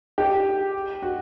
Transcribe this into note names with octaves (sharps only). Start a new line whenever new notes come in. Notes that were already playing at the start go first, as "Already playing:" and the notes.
G4
F#4